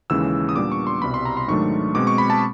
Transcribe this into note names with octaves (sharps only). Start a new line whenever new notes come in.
D#2 C#3 E3 G#3 C#4 E6
D#6
A#2 G3 B3 D4 D6
C#6
C6
C2 B2 G3 B5
C6
A#5
C6
G#2 D#3 F#3 A3 D4 C#6
B2 G#3 C4 D6
C#6
B5
A5